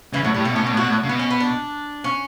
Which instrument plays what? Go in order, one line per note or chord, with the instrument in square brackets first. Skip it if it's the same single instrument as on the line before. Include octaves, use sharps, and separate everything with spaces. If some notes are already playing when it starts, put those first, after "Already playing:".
[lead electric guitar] C#3 [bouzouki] E3
[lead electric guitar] A2 [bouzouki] F#3
[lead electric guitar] A2 [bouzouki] G3
[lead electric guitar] B2 [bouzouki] A3
[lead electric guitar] A2 [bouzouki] C#4
[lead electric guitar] B2
[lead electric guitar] A2 [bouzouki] D4
[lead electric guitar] B2 [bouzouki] F#4
[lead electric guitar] A2
[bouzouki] F#4
[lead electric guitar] C#3
[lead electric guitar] B2 [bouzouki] B3
[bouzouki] C#4
B3
D4
C#4